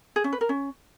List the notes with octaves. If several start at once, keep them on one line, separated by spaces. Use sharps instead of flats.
G#4
C#4
B4
A#4
C#4